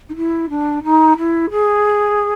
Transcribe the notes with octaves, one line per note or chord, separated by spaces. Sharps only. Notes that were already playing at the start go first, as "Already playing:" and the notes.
D#4
E4
D4
D#4
E4
G#4